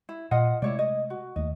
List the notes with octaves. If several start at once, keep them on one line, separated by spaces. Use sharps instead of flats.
E4
A#2 F4 D#5 F#5
C3 G#3 A3 E4 C#5 D5
D#5
F#4
D#2 A3 D#5